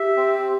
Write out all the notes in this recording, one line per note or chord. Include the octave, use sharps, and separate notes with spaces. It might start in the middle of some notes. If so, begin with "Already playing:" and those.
Already playing: G4 E5
C4